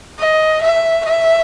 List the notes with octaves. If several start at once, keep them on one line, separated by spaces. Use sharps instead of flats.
D#5
E5
E5